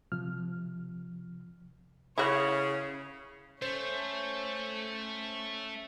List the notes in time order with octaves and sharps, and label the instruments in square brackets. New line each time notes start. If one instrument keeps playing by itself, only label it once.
[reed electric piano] C3 F3 F6
[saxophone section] C#3 [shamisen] E4 F#4 [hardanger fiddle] C#5 [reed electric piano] D#6
[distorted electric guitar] A3 [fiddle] C#4 [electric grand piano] C5